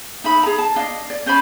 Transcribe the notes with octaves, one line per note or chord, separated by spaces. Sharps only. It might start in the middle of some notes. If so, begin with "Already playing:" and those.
D#4 E5 B5
G#4 A#5
A5
D4 D#5 F5
D5
C#4 C5 G#5 B5